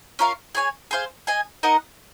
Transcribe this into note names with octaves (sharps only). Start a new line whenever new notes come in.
C#4 F4 A#4 F5
G#4 C#5 G#5
G#4 C5 F5
G#4 D#5 G#5
D#4 A#4 D#5 F#5